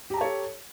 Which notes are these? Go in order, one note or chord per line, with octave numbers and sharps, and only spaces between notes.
G4 A4 C#5 A5 A#5